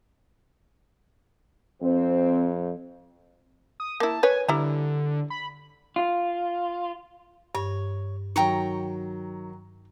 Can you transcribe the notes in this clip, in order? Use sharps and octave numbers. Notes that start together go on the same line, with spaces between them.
F2 C4
D#6
A#3 E4 A5
B4 C#5 G#5
D3 G3 E4 A#5
B5
F4
G2 C#5
D#3 F#3 G5 A#5 C#6